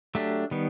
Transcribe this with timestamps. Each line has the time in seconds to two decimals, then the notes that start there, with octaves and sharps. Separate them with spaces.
0.15 F#3 A3 D4 G4
0.51 D#3 G3 B3